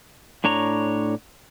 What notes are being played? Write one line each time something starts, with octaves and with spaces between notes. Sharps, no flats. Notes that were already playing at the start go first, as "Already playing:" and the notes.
A2 D4 C#5 A#5